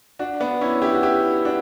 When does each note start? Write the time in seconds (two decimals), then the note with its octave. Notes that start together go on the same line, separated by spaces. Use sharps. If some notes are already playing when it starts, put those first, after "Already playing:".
0.19 D4 F#4
0.40 B3 D4
0.61 C#4 E4
0.82 E4 G4
0.95 F#4
1.03 E4 G4
1.45 D4 F#4